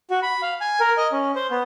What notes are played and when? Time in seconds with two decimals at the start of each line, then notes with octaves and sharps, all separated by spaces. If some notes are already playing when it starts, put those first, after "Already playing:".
0.10 F#4
0.22 B5
0.42 F5
0.61 G#5
0.80 A#4
0.97 D#5
1.12 C#4
1.35 C5
1.51 B3